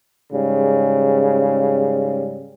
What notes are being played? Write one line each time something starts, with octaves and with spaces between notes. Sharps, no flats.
G#2 C#3 G3